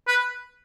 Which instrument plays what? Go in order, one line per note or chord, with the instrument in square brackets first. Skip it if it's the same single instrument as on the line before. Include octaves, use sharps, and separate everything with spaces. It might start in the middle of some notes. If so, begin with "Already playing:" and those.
[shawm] B4